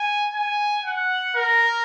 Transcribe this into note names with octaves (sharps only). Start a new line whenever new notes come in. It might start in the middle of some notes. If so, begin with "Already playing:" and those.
Already playing: G#5
G#5
F#5
A#4